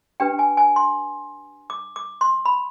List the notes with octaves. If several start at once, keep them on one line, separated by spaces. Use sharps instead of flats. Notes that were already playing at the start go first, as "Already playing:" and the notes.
D4 G4 B4 G5
G#5
G#5
C6
D6
D6
C6
B5